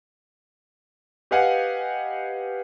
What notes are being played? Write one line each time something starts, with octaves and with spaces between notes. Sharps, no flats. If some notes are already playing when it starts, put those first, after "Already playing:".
G4 B4 D#5 F5 F#5 G#5